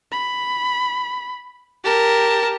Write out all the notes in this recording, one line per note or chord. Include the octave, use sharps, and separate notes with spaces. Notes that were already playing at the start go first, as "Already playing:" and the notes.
B5
G4 A#4 A5